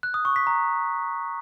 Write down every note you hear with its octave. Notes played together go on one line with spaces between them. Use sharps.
F#6
D#6
C#6
B6
A#5